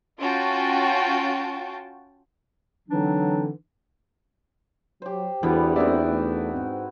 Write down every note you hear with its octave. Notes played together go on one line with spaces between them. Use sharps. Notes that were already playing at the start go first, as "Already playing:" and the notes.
C#4 F4 F#4 G5 A5
D3 E3 F#3 C4 D4 D#4
F#3 G4 C5
E2 D3 E3 G3 B3 F#4 G#4
A3 A#3 C4 D#4 E4 F#4 D5 E5
A3
G#2 C4